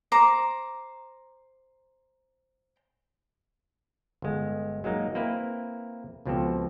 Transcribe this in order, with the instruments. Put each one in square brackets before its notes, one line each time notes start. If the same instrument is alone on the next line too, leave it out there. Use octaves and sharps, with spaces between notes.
[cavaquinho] C5 A#5 D6
[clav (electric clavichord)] G1 G#3
F#3 G#3 A#3 D#4
A#3 C4 E4 B4
C#2 B2 F3 C4 G4 A4